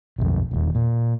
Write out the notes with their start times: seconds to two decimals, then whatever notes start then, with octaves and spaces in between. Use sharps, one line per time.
0.19 B1 F2
0.51 E1 D#2
0.75 A#2